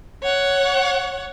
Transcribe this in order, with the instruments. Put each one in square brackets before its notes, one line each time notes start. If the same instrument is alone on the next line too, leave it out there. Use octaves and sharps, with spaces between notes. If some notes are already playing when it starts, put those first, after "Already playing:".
[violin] C#5 F#5